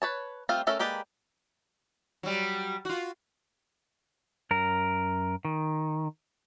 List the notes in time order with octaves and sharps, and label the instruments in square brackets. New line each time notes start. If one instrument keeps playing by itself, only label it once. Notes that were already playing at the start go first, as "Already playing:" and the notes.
[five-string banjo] B4 C#5 A5
G3 A3 C4 F4 F5
A3 C#4 A4 A#4 E5
G#3 A#3 G4 B4 D5
[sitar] F#3 G3
F4 F#4
[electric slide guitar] F#2 A#4
D#3